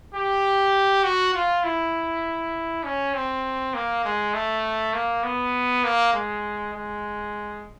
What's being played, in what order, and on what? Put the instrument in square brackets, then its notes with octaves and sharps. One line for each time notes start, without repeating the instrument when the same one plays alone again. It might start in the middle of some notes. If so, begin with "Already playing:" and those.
[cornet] G4
F#4
F4
E4
C#4
C4
A#3
G#3
A3
A#3
B3
A#3
G#3
G#3